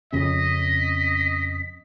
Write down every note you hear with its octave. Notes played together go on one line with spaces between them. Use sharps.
F2 C#3 C#4 D#5 B6